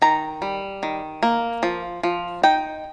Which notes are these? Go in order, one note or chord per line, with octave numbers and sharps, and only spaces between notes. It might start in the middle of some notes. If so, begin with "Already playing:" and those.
D#3 A#5
G3
D#3
A#3
F3
F3
D#4 G5